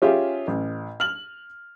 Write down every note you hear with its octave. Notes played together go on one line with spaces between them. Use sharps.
C#4 F4 G4 G#4 E5
A1
F6 F#7